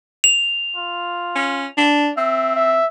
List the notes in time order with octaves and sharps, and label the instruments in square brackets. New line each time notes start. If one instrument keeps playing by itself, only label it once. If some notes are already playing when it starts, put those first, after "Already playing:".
[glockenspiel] F7
[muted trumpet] F4
[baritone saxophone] C#4
D4
[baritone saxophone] C4 [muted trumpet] E5
[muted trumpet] E5